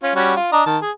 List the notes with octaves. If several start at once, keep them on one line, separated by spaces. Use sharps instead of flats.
C#4 F4
G3 C#4 F#4
F4
D4 D#5 A#5
D#3 A5
G#4